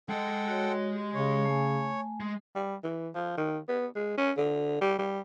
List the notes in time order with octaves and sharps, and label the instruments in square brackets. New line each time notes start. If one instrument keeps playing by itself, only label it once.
[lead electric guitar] G#3 D#5 [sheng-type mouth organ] A4 F#5 G5
[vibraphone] F#4 C#5
G4
[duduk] C#3 [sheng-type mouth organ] C#5
[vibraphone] A3 G#5
[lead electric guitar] G#3
[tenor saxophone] G3
E3
F3
D#3
B3
G#3
C#4
D3
G3
G3